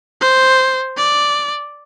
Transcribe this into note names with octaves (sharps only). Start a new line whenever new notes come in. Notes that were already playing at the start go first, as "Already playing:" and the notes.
C5
D5